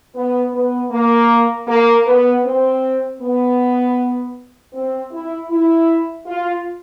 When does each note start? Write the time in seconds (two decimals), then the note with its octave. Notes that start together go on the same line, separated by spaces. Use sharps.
0.15 B3
0.53 B3
0.90 A#3
1.67 A#3
2.06 B3
2.44 C4
3.21 B3
4.73 C4
5.11 E4
5.49 E4
6.26 F4